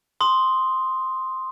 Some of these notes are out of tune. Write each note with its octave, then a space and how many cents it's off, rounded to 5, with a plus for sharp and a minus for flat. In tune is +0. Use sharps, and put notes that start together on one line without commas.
C6 +0 D#6 +0